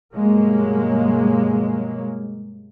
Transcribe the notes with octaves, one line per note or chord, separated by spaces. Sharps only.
G2 B2 F#3 G#3 A#3